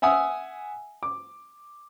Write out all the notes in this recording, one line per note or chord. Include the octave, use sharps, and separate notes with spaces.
E5 F#5 G#5 D#6 E6
D6